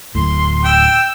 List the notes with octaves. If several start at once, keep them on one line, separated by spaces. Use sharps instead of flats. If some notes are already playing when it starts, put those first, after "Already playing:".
D1 A2 C6
G5 E6